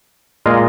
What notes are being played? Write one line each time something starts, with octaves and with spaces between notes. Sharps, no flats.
A#2 G#3 F4 A#4 D#5